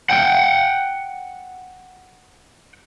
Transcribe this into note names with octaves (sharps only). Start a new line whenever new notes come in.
F#5 G5